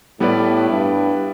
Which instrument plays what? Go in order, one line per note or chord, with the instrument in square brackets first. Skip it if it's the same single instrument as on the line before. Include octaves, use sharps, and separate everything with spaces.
[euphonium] A2 [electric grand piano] G3 B3 E4 B4 D5
[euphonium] G2